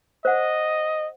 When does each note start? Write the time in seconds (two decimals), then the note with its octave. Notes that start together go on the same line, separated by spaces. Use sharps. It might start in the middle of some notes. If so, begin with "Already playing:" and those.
0.25 C5 D#5 F#5